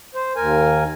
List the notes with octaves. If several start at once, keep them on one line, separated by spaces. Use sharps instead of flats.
C5
D#2 A#4 G#5